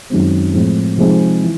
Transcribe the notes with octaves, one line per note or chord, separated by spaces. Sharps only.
F#2 D#3 G#3 C4
A2 F3 G#3 C4 E4
C3 F3 G#3 C4 D#4
E3